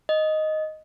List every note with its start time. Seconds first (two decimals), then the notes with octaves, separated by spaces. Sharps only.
0.09 D#5